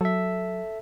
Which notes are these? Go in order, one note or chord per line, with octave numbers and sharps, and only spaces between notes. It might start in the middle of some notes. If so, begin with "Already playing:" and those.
F#3 A4 E5